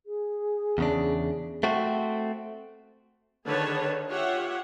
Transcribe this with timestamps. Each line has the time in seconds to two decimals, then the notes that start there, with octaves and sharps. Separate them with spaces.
0.05 G#4
0.78 E2 C#3 D4
1.63 A3 C4 F#4
3.47 D3 D#3 G#4 B4 C#5 A5
4.08 F4 G4 C#5 E5 F#5